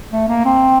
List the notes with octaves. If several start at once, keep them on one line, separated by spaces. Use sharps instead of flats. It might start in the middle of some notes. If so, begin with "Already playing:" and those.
A3
A#3
C4